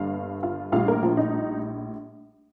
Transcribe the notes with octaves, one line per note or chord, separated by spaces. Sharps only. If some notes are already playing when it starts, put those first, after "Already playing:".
Already playing: G1 G2 A#3 F5
F4 F5
A#1 A2 G3 F4 F5
A#3 A#4
F3 F4
D#4